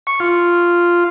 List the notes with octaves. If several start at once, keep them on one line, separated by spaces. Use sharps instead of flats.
C#6
F4